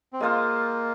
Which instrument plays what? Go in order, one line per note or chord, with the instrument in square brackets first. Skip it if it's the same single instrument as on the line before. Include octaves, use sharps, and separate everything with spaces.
[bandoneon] C4
[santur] G#3 F4 C5 F5 [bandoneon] A#3